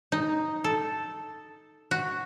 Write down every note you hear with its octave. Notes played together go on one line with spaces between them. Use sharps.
D#4
A4
F#4